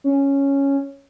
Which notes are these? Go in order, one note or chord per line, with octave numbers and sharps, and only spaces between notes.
C#4